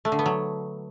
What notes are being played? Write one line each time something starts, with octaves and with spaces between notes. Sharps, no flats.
A3
D3
B3
F#3